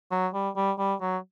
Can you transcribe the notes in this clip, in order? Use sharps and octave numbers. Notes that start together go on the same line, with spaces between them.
F#3
G3
G3
G3
F#3